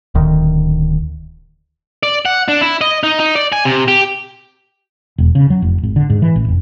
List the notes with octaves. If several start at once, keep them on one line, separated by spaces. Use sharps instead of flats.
D1 D2 D#3
D5
F#5
D4
E4
D#5
D#4
D#4
D5
G#5
C3
G4
E1
C#3
F#3
F1
G#1
D3
G#2
E3
A1
F1